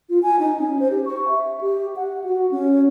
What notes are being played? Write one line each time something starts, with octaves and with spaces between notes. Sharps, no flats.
F4
G#5
D#4
C#4
C5
G4
C#6
E5
G4
F#5
F#4
C#4